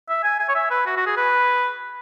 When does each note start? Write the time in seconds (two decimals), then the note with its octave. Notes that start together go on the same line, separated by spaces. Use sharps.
0.09 E5
0.24 G#5
0.39 G#5
0.49 C#5
0.55 E5
0.71 B4
0.86 F#4
0.97 F#4
1.07 G#4
1.17 B4